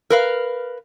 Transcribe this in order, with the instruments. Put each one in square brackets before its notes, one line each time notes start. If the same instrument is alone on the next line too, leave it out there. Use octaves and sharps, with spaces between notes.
[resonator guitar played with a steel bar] A#4 B4 F5